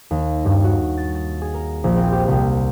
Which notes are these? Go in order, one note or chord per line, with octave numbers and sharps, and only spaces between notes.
D#2
G2
F#4
A6
A6
G#4
A#4
A#1
C4
G4
C2